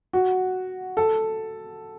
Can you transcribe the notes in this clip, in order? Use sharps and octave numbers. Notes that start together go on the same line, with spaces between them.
F#4
A4